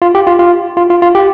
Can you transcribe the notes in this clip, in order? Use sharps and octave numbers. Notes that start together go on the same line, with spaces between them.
F4
G4
F4
F4
F4
F4
F4
G4